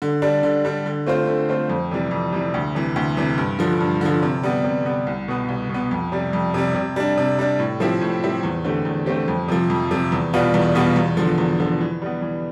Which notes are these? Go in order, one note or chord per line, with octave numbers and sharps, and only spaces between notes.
D3
G3 D4
D3
G3 D4
D3
A3 C4 F4 C5
D3
A3 C4 F4 C5
F2
C3 E3 G3
F2
C3 E3 G3
D2
C3 E3
D2
C3 E3
G2
D3 F3
G2
D3 F3
C3
G3 B3
C3
G3 B3
C2
B2 B3
C2
B2
B3
F2
C3 G3
F2
C3 G3
C3
G3 D4
C3
G3 D4
A2
F3 C4 E4 G4
A2
F3 C4 E4 G4
E2
D3 A3 C4 G4
E2
D3 A3 C4 G4
F2
C3 F3
F2
C3 F3
E2
B2 G3 B3 F4
E2
B2 G3 B3 F4
E2
D3 F3
E2
D3 F3
E3
G3 B3
E3